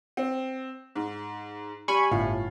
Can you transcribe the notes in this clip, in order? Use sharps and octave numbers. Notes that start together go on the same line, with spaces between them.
C4
G#2
G3 G#5 B5 C#6
G1 A2 F4